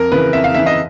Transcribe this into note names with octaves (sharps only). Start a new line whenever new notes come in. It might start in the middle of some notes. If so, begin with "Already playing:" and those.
Already playing: F2 A#4
C#3 E3 B4
F2 E5
F5
C#3 E3 E5
D#5